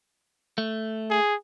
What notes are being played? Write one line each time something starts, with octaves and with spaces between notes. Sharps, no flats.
A3
G#4